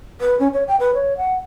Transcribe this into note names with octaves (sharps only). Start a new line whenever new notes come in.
B4
C#4
C#5
G5
B4
C#5
F#5